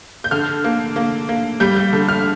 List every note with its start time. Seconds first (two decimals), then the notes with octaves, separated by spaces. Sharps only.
0.24 G6
0.31 D3 F6
0.64 A#3
0.96 A#3
1.29 A#3
1.60 G3 G6
1.77 G6
1.93 D3
2.09 F6